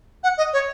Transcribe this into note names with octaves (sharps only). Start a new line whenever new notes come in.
F#5
D#5
C#5